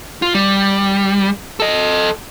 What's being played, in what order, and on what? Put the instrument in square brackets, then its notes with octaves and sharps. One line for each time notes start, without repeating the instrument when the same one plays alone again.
[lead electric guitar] F4
G3
A4 D#5